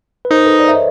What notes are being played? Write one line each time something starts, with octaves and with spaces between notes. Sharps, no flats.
B4
D#4 A#4 C5
A4 B4
C5 D5
E5
C#5 D#5